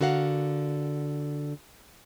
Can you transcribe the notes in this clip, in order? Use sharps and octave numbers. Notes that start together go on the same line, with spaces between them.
D3 F#4 A#4 F5 F#5